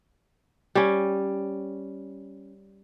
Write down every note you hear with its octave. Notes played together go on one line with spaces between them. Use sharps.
G3 C#4